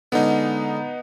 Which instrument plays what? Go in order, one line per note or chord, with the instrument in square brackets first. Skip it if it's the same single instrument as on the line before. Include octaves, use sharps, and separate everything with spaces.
[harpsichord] D3 G#3 C#4 [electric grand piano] B3 D#4